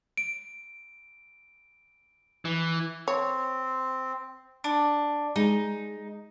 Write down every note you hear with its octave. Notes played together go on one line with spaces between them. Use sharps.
D7
E3
C4 C#5
D4
G#3 D#4